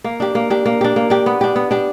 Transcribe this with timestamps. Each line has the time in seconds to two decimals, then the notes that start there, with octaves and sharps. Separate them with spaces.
0.04 A#3
0.20 D4 G4
0.35 A#3
0.50 D4 G4
0.66 A#3
0.81 D4 G4
0.96 A#3
1.10 D4 G4
1.26 B3
1.41 D4 G4
1.56 B3
1.71 D4 G4